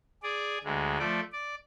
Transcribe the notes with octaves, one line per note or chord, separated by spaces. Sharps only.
G#4 D5
D2 G#3
F3 A3 D5
D5